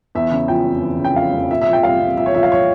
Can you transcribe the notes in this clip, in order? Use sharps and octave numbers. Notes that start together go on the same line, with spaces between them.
E2 E5
C#3
F3 G5
F1
E2
C#3
G5
F3 F5
F1
A#2 E5
E5
F3
G5
C2 F5
C2
A#2 E5
C#5
F3 E5
F5
C#5